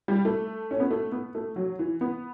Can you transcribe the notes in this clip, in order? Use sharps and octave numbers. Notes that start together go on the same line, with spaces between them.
G3
A3
C#4
B3
A3
B3
A3
F#3
E3
B3